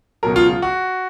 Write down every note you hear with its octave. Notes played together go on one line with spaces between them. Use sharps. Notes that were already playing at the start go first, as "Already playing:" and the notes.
C#2 B2 F#3 A#4
F4
F4
F#4